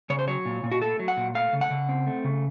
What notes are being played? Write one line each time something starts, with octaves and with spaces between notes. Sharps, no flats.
C#3 C#5
C5
F#3 C#5
A#2
A#2
F#4
A3 A4
F#3
F#5
A#2
A3 F5
C#3
F#5
C#3
C4
A3
C#3